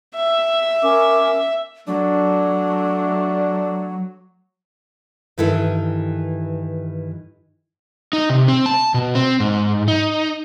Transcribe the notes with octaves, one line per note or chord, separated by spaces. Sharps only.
E5
C#4 A#4 D6
F#3 A3 D4
G2 D#3 E3 E4 A4
D#4
C3
C4
A5
B2
C4
G#2
D#4